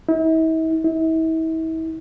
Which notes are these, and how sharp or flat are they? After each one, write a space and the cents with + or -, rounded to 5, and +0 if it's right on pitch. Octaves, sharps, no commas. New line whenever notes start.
E4 -45
E4 -40